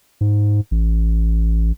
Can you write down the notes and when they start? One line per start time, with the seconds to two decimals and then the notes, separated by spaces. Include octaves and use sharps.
0.21 G#2
0.71 A1